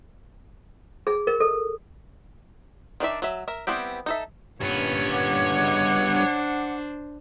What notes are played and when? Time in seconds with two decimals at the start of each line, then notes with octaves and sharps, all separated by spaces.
1.07 G#4
1.27 A#4
1.40 A4
3.00 D#3 D4 D5 E5
3.22 F#3 E5
3.48 A#4 E5
3.67 G3 B3 C4 E4 G4
4.06 D#4 A4 E5
4.61 G2 A#2 B3 C#4 C#5
5.11 F#5 D6
5.56 C#3 D#5
6.11 D4 C5